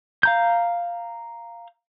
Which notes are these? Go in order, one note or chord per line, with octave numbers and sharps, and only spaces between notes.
F5 A#5 G6